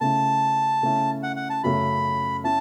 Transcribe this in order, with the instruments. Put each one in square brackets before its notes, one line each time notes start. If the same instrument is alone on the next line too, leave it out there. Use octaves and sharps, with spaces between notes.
[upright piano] C#3 A3 C#4 E4 [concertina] A5
[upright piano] C#3 A3 C#4 E4
[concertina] F#5
F#5
A5
[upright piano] F#2 C#3 A3 [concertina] B5
[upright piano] C#4 E4 [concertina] A5